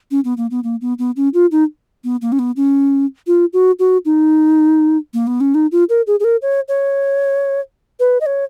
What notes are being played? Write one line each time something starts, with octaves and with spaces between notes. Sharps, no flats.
C#4
B3
A#3
B3
A#3
B3
B3
C#4
F4
D#4
B3
A#3
C#4
B3
C#4
F4
F#4
F#4
D#4
A#3
B3
C#4
D#4
F4
A#4
G#4
G#4
A#4
C#5
C#5
B4
D#5
C#5